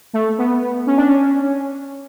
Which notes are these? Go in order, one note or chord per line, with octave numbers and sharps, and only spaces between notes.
A3
B3
C#4
D4
C#4